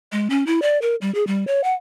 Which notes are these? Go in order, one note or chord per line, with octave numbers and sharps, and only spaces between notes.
G#3
C#4
E4
D5
A#4
G3
G#4
G3
C#5
F#5